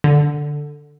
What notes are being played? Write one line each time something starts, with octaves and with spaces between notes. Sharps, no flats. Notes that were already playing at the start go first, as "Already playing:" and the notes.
D3